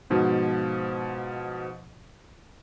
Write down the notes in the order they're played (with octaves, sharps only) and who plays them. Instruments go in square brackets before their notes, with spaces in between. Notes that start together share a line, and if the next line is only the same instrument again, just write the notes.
[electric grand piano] G#2 B2 F3